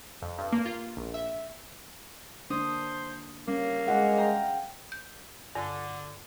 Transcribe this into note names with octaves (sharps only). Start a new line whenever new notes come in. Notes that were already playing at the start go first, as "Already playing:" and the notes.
F2
G2
A#3
F4
A#1
E5
A#3 D4 C5 D#6
G3 A#3 C#4
G#3 G#4 F#5
F5 G5 A#5
G6
G2 D3